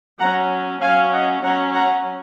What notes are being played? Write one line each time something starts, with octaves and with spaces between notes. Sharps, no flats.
F#3 C#4 F#5 A#5
F#3 C#4 F5 G#5
D#5 F#5
F#3 C#4 F#5 A#5
F#5 A#5